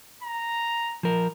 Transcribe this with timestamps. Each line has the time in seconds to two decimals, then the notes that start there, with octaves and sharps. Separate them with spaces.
0.23 A#5
1.03 F3 A#4